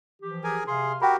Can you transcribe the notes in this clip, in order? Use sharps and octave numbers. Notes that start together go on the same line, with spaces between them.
E3 F3 G4
G#4 A#4 G#5
C3 G#4 F5 C6
F#4 G4 A#4 G5 B5